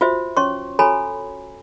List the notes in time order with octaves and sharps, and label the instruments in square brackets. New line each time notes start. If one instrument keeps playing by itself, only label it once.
[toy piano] F4 F#4 C5 E5
C#4 C#5 C6 C#6
F#4 A4 C#5 G#5 A#5 B5